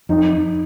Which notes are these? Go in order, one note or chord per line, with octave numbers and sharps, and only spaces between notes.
F2 D#4